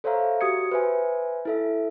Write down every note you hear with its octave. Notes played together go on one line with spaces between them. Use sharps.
A4 C5 C#5 E5 F5 A#5
F#4 G4 D#6 G#6 C#7
B4 C5 E5 G#5
E4 A4 E5